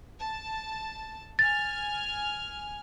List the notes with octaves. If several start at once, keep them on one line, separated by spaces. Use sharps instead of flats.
A5
G#5 F6 A6